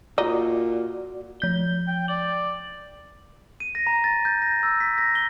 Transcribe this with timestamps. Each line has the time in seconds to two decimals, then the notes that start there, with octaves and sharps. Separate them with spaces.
0.18 A#2 D#4 F#4 D5
1.40 F3 G6 G7
1.87 G5
2.08 D5 F#7
3.60 D#7
3.75 A#6
3.87 A#5
4.04 A6
4.25 G6
4.42 A#6
4.63 E6
4.80 B6
4.98 A#6
5.15 G7